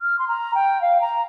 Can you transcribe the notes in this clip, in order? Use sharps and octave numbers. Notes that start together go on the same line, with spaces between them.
F6
C6
A#5
G5
F5
A#5